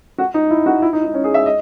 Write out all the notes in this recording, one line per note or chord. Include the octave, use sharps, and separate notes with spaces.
F#4
D#4
E4
F#4
E4
D#4
D#4
C#4
G#4
E5
D#5